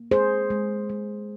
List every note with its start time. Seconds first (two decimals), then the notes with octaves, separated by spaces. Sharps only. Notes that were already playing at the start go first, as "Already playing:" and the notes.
Already playing: A#3
0.11 G#3 G#4 C5
0.50 G#3
0.90 G#3